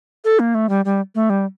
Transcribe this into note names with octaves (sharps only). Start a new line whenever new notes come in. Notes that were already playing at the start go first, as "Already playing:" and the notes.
A4
A#3
A3
G3
G3
A3
G3